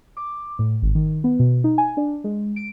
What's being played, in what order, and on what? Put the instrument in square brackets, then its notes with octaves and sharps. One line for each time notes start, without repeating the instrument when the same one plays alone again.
[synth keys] D6
A2
G#1
D#3
B3
B2
D#4
G#5
D4
G#3
D7